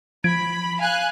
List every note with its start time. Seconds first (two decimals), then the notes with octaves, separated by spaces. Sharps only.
0.24 F3 B5 G#6 D7
0.78 F5 G#5 F#6